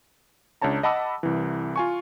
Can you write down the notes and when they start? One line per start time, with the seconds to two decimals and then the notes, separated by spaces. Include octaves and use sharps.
0.61 C#2 D4 C#5 A5 A#5
0.83 D#5 F#5 A5 B5 D6 E6
1.23 C2 E3
1.76 F4 G#5 C#6